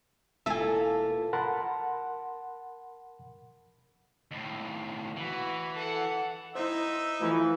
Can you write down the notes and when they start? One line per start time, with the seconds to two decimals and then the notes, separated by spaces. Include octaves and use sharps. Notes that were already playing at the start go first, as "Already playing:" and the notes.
0.46 E1 A#3 E4 F4 A4 E5 G#5
1.33 A#4 F#5 A5 B5 C6
4.31 D#2 A2
5.17 E3 F#4 B4
5.75 A4 F#5
6.55 D#4 E4 C5 E5
7.21 E3 F3 A3 E4 F4